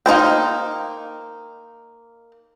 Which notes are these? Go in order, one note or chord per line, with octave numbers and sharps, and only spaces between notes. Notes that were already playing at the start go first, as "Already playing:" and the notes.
A#3 D#4 C5 G5